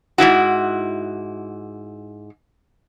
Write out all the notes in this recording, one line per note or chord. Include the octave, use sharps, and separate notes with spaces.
G#2 E3 E4 F#4